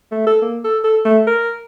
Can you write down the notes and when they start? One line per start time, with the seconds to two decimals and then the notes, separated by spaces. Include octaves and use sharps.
0.12 A3
0.27 A4
0.42 A#3
0.64 A4
0.84 A4
1.05 A3
1.27 A#4